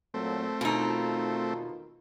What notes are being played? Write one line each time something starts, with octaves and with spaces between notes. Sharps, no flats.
A#2 F#3 A3 C4
E2 B2 D#3 D#4 F4